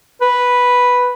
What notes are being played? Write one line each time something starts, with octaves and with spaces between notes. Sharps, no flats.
B4